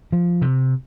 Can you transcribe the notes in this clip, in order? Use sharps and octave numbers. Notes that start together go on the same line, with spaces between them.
F3
C3